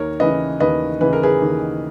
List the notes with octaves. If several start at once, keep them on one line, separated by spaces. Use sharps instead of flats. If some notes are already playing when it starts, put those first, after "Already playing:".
Already playing: D#2 A#4 C#5
C#3 E3 B4 D#5
D#2 B4 D#5
C#3 E3 B4
A#4
G#4 B4
D#2